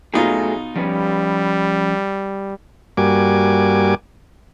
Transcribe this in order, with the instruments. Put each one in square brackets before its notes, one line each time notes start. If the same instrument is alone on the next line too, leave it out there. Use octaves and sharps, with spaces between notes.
[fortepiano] B2 D#4 F4 [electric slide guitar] F#3 A3 G#4
[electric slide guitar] F3 C#4 B4 [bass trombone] G3
[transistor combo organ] G2 G3 A#3 F#4 G#5 D6